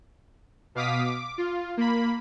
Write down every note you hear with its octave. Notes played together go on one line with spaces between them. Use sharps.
B2 F5 D6 D#6 B6
D6
F4
A#3 B5